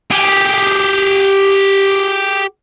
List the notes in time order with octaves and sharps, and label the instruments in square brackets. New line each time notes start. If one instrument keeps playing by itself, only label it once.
[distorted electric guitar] G4 G#4